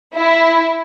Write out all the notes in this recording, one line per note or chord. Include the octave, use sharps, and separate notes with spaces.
E4